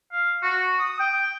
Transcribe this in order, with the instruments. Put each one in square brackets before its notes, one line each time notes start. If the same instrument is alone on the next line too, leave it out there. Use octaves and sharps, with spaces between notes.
[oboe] F5
F#4
D#6
G5